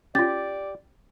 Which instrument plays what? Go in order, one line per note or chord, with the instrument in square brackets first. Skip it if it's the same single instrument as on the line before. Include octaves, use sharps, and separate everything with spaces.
[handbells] C#4 F4 [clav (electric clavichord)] G4 [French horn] D5 [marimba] A6